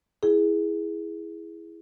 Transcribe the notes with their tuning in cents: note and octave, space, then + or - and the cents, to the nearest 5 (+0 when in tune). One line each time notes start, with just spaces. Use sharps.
E4 +0 G#4 +0